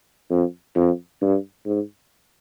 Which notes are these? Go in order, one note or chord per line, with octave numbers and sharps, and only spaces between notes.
F2
F2
G2
G#2